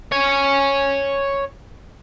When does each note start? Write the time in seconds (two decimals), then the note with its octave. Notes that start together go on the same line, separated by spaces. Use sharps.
0.12 C#5 G#5